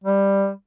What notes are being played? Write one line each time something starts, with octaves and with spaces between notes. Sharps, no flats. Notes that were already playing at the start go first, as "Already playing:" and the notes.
G3